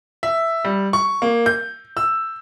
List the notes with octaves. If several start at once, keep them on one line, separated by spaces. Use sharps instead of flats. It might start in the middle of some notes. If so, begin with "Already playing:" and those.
E5
G3
C#6
A#3
G6
E6